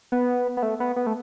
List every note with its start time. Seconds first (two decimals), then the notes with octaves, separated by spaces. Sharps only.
0.12 B3
0.57 B3
0.63 A3
0.80 B3
0.96 B3
1.07 A3